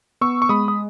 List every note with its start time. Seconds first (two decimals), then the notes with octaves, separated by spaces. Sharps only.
0.21 B3 C#6 E6
0.42 C#6
0.49 G#3 B5 D#6
0.68 D#6